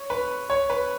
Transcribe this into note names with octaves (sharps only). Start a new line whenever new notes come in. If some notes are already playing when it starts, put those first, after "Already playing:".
Already playing: C#5
B4
C#5
B4